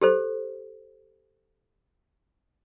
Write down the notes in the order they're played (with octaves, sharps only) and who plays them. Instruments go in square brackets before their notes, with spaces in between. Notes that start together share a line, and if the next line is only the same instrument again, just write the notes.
[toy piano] G4 A4 C5